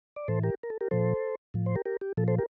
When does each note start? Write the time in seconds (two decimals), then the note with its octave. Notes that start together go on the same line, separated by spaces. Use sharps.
0.16 D5
0.28 A2 E3 A4 C5
0.43 G4 A#4
0.63 A#4
0.70 A4
0.81 G4 A#4
0.91 A#2 F3 A4 C5
1.54 A2 F3
1.66 C5
1.75 G4 A#4
1.85 G4 A#4
2.01 G4
2.17 A#2 F3 A4
2.28 A4 C5
2.38 G4 A#4